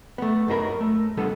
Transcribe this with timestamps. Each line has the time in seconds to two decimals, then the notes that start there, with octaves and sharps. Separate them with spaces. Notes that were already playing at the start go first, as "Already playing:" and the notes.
0.18 A3 B3
0.48 F#2 F#3 D#4 A4 A#4 B5
0.81 A3
1.17 C#2 D3 G3 B3 A4